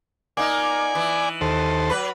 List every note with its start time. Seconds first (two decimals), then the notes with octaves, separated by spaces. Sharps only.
0.37 A#3 D#4 D5 G#5
0.95 E3
1.41 D#2 A4 C5
1.90 F#3 B4